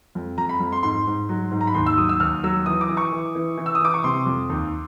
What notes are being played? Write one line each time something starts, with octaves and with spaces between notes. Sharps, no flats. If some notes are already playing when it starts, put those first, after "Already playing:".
F2
F2 A#5
B5
F2
C6
G#2 C6
G#2
F#3
G#2
A#5
B5
D#2 C6
E6
F#3 D#6
E6
D#2 F6
F#3 E6
E3 D#6
D6
E3
C#6
E3
E3
E3
E6
D#6
E3 D6
C#6
C3 C6
F2
D#2